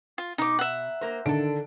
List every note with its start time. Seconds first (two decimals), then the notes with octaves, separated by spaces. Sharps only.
0.18 F4
0.38 B2 D#4 A#5 D6
0.59 E5 F#5
1.01 A#3 A#4 C5
1.26 D3 D#3 D4 A4 D7